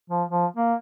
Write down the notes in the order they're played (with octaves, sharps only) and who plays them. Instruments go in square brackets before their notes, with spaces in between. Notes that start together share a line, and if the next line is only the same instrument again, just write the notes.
[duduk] F3
F3
A#3